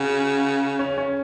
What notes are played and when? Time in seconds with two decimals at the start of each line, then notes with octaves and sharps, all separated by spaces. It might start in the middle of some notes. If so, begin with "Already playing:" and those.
Already playing: C#3 F#4
0.79 C#4
0.98 C#4